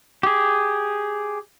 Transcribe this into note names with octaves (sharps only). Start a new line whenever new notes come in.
G4 G#4